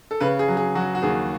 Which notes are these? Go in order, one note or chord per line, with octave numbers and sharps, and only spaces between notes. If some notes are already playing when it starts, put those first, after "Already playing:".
A4
C#3 B4
G#4
F#3
G#4
F#3 F#4
F#4
D#2 G#4